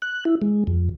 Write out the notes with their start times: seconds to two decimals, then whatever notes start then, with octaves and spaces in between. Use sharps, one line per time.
0.02 F#6
0.25 E4
0.42 G#3
0.67 F2